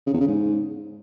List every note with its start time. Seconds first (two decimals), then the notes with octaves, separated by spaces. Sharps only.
0.07 C#3
0.13 E2
0.20 C#3
0.27 G#2